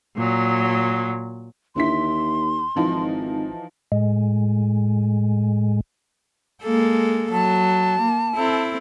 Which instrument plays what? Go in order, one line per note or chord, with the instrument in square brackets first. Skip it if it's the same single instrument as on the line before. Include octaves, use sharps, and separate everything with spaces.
[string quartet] A#2 F#3
[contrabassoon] D#2 [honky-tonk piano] D3 E4 B6 [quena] C6
[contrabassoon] G#1 [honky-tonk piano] E3 F3 D#4
[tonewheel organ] A2 G#3
[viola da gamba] G#3 A#3 A4
[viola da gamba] F#3 [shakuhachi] A5
[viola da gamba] A#3
C4 E4 A4